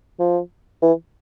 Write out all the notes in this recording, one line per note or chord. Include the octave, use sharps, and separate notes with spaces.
F3
E3